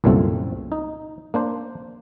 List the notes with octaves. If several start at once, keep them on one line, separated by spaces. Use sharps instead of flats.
C2 F#2 A#2 D3 A3 C4
D#4
A#3 D4 C5